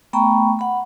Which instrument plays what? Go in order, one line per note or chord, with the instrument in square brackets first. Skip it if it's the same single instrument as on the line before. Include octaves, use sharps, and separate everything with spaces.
[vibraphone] A3 B3 G5 A#5 B5 C#6
F#5 B5